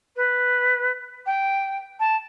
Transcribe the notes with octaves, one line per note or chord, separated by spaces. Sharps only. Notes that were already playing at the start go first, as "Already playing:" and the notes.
B4
G5
A5